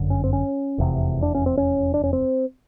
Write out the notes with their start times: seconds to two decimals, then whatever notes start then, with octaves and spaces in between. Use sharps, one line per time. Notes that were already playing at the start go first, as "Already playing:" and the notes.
Already playing: G1 F#2 D3
0.10 C#4
0.24 C4
0.33 C#4
0.78 F1 E2 C3
1.23 D4
1.35 C#4
1.46 C4
1.57 C#4
1.94 D4
2.04 C#4
2.13 C4